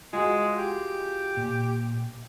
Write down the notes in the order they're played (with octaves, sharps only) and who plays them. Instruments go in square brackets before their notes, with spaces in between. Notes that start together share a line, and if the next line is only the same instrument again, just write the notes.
[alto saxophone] G#3 [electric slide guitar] F4 F#4 G#4
[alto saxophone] G4
[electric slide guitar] A#2